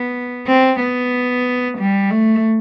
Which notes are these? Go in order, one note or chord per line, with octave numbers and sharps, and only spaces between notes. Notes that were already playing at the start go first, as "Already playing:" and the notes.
Already playing: B3
C4
B3
G3
A3